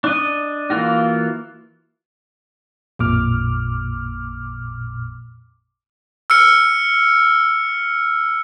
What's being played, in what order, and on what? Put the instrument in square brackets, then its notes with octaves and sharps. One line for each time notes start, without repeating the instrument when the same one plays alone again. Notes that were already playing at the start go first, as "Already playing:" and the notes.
[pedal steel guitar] D4 D#5
E3 A#3 F4 F#4
[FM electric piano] A1 F2 A#2 D6 F6
[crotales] E6 F6 C#7